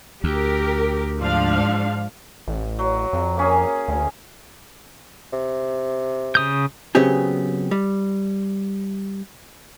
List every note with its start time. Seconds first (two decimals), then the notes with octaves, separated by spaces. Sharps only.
0.24 D2 G4 A#4
1.20 G#2 F3 D4 F5
2.48 A1
2.79 F#3
3.13 F2
3.37 A#3 C#4 G#4
3.88 D2
5.32 C3
6.35 C#3 D#6 G6
6.95 C#3 F#3 B3 C4 G4 G#4
7.71 G3